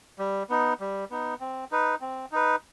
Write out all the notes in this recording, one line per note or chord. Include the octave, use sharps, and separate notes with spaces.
G3
B3 D#4
G3
B3 D#4
C4
D#4 B4
C4
D#4 B4